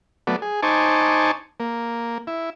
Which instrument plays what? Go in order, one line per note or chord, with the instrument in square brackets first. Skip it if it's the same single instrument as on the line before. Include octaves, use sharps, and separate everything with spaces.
[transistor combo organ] F#3 A3 B3 D5
G#4
D#4 C5 G#5 A5 C#6 D6
A#3
E4